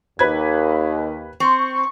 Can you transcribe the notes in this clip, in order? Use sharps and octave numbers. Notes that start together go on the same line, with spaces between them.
D#2 B4 G#6
C4 C#6